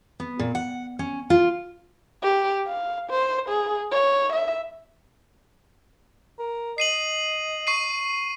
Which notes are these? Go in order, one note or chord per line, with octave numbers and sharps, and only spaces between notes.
B3
A#2
F#5
C#4
F4
G4
F5
C5
G#4
C#5
E5
A#4
D#5 C7 D#7 F#7
C#6 C7 D#7